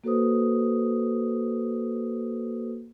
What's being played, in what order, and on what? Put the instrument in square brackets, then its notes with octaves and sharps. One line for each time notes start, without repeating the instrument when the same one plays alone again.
[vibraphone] A#3 F#4 A4 B4 C5 D#6